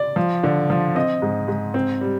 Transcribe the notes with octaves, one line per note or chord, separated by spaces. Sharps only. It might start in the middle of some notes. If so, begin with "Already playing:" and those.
Already playing: D5
F3
D3
F3
C4 D#5
G#2
G#2
C4
G3